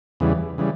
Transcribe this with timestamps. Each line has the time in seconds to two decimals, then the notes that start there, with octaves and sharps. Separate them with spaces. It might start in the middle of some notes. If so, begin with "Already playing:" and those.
0.20 E2 C#3 E3 G3
0.58 C#3 E3 G3